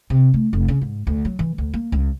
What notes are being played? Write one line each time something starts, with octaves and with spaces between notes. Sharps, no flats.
C3
A3
F1
C#3
G#2
D2
F#3
E3
D2
A#3
C#2